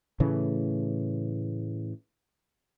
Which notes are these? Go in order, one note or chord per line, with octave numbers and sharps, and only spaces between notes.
A2 C#3 E3 A3